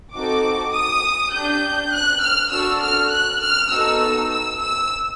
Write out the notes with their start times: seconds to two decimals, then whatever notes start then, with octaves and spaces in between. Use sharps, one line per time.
0.14 C4 D#4 F#4 A4 D6
0.74 D#6
1.33 D4 G4 G6
1.93 F#6
2.22 F6
2.52 D4 F#4 A4 E6
2.82 F6
3.12 F#6
3.41 F6
3.71 B3 D#4 F#4 A4 E6
4.31 E6
4.61 E6